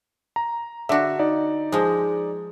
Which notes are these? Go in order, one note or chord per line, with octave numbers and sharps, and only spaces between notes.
A#5
D3 F#4 E5
D#4 D5
F3 G#3